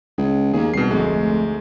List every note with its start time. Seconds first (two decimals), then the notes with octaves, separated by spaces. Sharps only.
0.18 C#2 G#4
0.53 D#2 A#3 G#4
0.74 C2 B2 C7
0.90 F1 D2 G#3 A3